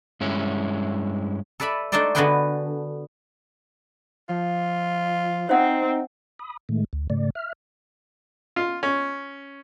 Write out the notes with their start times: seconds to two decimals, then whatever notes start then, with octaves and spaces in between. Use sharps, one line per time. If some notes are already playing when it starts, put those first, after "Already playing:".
0.21 G2 G#3 C#4 E4
1.60 A4 B4 D5 E5 B5
1.92 A3 D4 D#4 A4 C5 D5
2.15 D3 B3 F#4 G#4 B4 G5
4.29 F3 F4
5.49 C4 D#4 C5 E5 F#5
6.39 B5 D#6
6.69 A2 D#3 G#3 A3
6.93 D2
7.10 G#2 C#3 A3 D5
7.35 E5 F6
8.56 F4
8.83 C#4